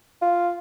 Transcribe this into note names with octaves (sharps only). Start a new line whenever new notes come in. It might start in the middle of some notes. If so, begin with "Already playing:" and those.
F4